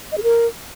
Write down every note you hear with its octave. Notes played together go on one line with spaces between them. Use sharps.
D#5
G#4
A#4